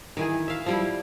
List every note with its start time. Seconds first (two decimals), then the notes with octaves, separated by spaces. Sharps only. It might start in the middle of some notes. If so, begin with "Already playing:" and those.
0.17 D#3 E3 G#4
0.48 E5 F5
0.66 F3 G3 E4